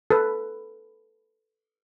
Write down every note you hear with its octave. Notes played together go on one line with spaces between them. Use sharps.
A4 B4